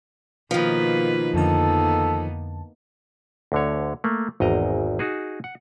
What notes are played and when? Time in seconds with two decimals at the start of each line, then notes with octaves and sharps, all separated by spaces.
0.51 B2 D#3 F3 A#3 B4
1.34 F2 D3 A#3 B3 D#4 A4 A5
3.52 D2 D3 C#5
4.04 A3 A#3
4.40 G#1 E2 D#5 A#5
4.99 D#4 F#4 G#4
5.44 F#5